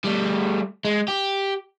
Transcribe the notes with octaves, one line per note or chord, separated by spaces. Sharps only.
G3 A3
G#3
G4